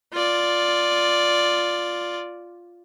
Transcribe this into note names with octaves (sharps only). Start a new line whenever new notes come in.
F4 D5